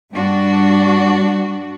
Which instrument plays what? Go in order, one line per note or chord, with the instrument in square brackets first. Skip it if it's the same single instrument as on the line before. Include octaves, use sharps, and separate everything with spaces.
[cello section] G2 G3 D4 F#4